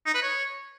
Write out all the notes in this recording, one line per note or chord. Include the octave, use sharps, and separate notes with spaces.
D#4
B4
C#5